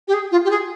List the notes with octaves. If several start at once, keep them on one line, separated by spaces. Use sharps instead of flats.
G4
G#4
F4
G4
G#4